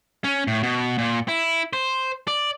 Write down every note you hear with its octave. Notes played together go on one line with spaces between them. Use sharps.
C#4
A2
B2
A#2
E4
C5
D5